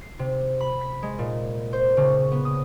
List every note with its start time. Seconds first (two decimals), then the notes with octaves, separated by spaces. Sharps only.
0.01 C7
0.19 C3
0.60 B5
0.81 B6
1.03 G#3
1.19 A#2
1.73 C5
1.97 C#3
2.32 B3
2.45 D#6